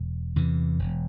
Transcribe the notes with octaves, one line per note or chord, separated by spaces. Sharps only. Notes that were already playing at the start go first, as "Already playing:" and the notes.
Already playing: E1
E2 C3 E3
E1